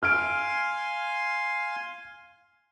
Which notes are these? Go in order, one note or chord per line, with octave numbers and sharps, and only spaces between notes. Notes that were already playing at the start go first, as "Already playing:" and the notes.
F5 G#5 C6 F6 D7